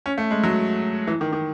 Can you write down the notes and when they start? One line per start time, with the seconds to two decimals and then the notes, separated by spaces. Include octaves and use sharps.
0.06 C#4
0.18 A3
0.31 G#3
0.43 F#3
1.07 E3
1.21 D#3
1.33 D#3